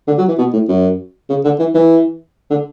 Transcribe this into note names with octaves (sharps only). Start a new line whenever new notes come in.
D3
F#3
E3
B2
A2
F#2
C#3
D3
E3
E3
D3